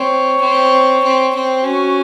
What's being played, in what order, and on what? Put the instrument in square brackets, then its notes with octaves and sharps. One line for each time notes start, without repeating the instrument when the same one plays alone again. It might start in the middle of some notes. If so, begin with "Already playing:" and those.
Already playing: [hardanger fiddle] C4 [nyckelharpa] C#5
[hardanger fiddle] C4
C4
C4
[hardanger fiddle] C#4 [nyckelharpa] F#4